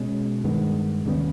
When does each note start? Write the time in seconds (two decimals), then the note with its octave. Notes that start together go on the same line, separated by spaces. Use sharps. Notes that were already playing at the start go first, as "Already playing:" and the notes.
Already playing: B2 G#3 C#4
0.44 G2 D#3 G#3 B3
1.06 D#2 C#3 G3 B3